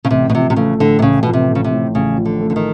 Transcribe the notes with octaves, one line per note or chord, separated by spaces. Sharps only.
C#3
A1 C3
B2
C3 F3
C3
C#3 A3
A2 D3
C3
A1 C#3
B2 F3
C3
A3
C#3
C3
A2
A1 C#3
F3
D3
A3
D3
D#3